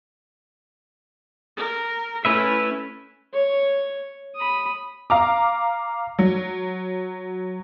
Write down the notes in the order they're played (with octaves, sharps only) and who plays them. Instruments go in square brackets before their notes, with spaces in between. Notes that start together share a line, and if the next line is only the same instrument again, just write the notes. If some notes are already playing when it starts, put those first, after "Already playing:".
[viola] A#4
[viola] A3 E4 [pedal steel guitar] C#4 B4 E5
[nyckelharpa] C#5
B5 D#6
[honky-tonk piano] F5 A#5 D6
F#3